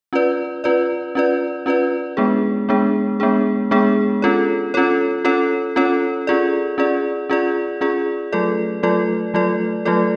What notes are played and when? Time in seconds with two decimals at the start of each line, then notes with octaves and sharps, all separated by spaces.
0.13 C#4 F4 B4 D5
0.64 C#4 F4 B4 D5
1.15 C#4 F4 B4 D5
1.66 C#4 F4 B4 D5
2.17 G#3 B3 D4 G#4
2.69 G#3 B3 D4 G#4
3.20 G#3 B3 D4 G#4
3.71 G#3 B3 D4 G#4
4.22 C#4 F4 A4 C#5
4.74 C#4 F4 A4 C#5
5.25 C#4 F4 A4 C#5
5.76 C#4 F4 A4 C#5
6.27 C#4 F4 G#4 D5
6.78 C#4 F4 G#4 D5
7.30 C#4 F4 G#4 D5
7.81 C#4 F4 G#4 D5
8.33 F#3 A3 F4 A4 D5
8.83 F#3 A3 F4 A4 D5
9.34 F#3 A3 F4 A4 D5
9.85 F#3 A3 F4 A4 D5